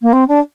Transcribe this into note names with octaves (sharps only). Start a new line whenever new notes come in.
A#3
C4
D4